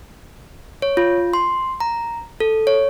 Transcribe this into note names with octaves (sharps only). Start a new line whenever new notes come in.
C#5
F4
C6
A#5
A4
C#5